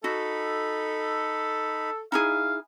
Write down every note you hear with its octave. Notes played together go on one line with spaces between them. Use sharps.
D#4 F#4 A4 B5
D#4 E4 G#4 F5